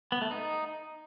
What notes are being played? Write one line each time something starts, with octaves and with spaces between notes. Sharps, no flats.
B3
A3
D#4